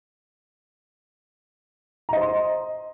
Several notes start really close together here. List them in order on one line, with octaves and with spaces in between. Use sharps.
A#5 D#5 C5 C6